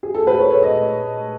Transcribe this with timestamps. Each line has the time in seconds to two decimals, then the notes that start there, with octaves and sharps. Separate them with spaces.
0.03 G#4
0.14 A4
0.27 B4
0.39 C#5
0.51 C#5
0.63 D#5